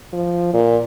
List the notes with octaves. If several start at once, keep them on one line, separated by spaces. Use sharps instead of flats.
F3
A#2